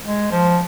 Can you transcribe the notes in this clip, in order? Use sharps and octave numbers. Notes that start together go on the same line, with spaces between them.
G#3
F3